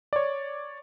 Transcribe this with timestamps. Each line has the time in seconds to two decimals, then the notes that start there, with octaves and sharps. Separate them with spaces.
0.13 C#5 D5